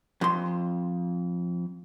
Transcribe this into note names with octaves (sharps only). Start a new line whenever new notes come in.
F2 C6